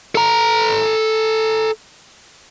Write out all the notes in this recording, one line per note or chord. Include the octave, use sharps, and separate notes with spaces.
A4 A#5